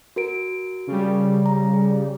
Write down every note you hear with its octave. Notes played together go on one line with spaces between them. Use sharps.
F#4 A#4 D7
C#3 G3
A#5
G#4